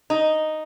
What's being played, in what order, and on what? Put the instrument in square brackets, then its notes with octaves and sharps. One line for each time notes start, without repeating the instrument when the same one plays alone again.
[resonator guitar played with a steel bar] D#4